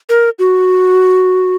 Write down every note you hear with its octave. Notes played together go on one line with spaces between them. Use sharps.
A#4
F#4